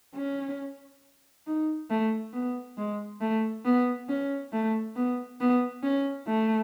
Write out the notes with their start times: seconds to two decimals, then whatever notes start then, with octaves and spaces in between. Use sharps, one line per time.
0.15 C#4
1.47 D#4
1.90 A3
2.33 B3
2.77 G#3
3.21 A3
3.65 B3
4.09 C#4
4.53 A3
4.96 B3
5.40 B3
5.83 C#4
6.28 A3